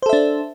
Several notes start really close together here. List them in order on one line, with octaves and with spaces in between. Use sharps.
C5 A4 E5 D4